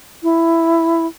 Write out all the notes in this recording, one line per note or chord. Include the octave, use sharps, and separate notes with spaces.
E4